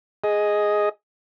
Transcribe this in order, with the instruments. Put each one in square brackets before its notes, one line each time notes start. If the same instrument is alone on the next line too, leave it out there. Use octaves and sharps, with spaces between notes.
[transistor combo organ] G#4 D#5